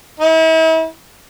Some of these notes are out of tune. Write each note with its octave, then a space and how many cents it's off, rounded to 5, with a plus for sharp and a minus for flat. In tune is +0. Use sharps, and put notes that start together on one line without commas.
E4 -40